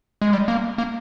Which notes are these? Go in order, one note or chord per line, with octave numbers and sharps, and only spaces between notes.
G#3
G3
A#3
A#3